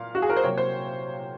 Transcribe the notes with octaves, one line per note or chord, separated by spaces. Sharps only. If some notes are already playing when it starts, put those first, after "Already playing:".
Already playing: A#2 F5
F#4
G#4
A#4
C5
C3 F#3 A#3 C#5
C5